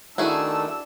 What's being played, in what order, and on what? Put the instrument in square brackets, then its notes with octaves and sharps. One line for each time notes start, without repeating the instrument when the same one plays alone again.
[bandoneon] D#3 A3 [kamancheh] D4 E6 [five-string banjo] E4 F#4 G#4